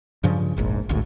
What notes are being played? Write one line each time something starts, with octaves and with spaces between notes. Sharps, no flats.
G2 C#3 F3
F1 A#1 G#2
G#1 D2 A2